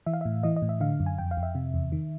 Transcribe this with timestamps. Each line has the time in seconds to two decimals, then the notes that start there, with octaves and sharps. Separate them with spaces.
0.06 E3 E5
0.13 F5
0.21 A2 E5
0.43 E3 D#5
0.56 D#5
0.62 A2
0.69 E5
0.80 D3 F5
1.00 F#2
1.06 G#5
1.18 F2 G5
1.31 F5
1.37 F2
1.43 E5
1.55 C3
1.74 E2
1.92 D#3